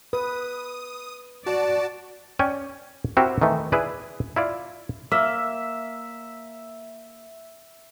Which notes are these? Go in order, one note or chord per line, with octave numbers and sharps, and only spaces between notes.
B4 D#6
F#4 D5 A5
C#4 D5 G5 G#5
C4 E4 F#4 G4 A#4
D#3 E3 A3
E4 G#4 B4 D5
E4 F4 D5
A#3 E5